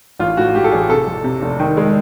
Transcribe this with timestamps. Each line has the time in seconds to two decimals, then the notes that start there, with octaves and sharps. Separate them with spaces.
0.19 A1 F4
0.37 A2 F#4
0.55 A2 G4
0.64 A4
0.71 A1 G#4
0.89 C3 A4
1.07 F2
1.24 C3
1.42 F1
1.59 D#3
1.77 G#3